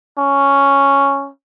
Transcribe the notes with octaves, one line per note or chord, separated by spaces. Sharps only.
C#4